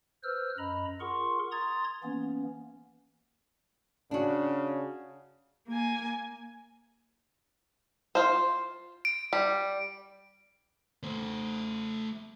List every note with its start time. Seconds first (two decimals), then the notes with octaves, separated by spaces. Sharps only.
0.23 B4 C5 E6 F6
0.58 F#2 D#5 A#5 B5
1.00 F4 G#4 A#4 F#5 C6 C#6
1.52 A#5 C6 D#6 G#6 A6
2.03 E3 A#3 B3 C#4
4.11 C#3 D4 F#4
5.68 A#3 G#5
8.15 F4 C5
9.05 D7
9.33 G3
11.04 A3 C5